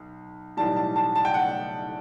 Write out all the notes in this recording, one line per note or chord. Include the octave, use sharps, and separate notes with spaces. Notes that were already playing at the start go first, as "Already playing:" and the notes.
Already playing: B1
B1 A2 E3 G3 A5
A5
A5
A5
G5
F#5